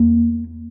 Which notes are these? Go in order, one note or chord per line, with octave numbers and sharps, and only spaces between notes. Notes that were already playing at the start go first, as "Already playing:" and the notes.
Already playing: E2 A#3